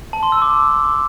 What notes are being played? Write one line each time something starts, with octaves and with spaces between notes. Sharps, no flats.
A5
C6
E6
D6